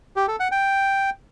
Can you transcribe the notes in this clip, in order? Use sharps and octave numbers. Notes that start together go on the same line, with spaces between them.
G4
A4
F#5
G5